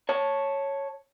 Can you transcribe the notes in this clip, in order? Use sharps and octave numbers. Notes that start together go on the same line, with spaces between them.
C#5 A5